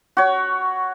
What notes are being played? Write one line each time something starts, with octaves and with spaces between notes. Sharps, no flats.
F#4 C#5